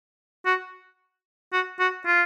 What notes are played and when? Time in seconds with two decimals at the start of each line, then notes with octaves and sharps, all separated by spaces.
0.46 F#4
1.52 F#4
1.79 F#4
2.06 F4